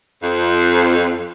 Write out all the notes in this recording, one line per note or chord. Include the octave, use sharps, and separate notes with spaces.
F2